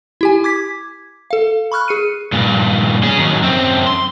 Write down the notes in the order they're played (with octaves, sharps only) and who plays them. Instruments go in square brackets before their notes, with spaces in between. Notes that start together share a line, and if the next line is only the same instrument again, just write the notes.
[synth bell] E4 G4 G#5
D6 G#6 B6
A4 F5
B5 C#6 F6 F#6
G#4 C#7 D#7
[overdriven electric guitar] G2 A#2
C#4 G#4
D#2 F#3
F#2 C4
C6